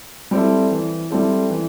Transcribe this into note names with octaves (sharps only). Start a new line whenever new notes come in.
G3 C4 E4 A4
E3
G3 C4 E4 A4
E3